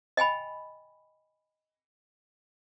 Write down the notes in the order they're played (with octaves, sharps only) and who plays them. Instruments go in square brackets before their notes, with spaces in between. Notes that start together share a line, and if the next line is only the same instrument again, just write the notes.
[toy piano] D#5 G5 G#5 B5